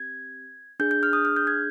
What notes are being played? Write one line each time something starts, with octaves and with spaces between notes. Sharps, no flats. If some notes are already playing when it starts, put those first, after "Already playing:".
Already playing: C4 G4 G#6
D4 G#4 G6
G6
F6
D#6
F6
G6
G#6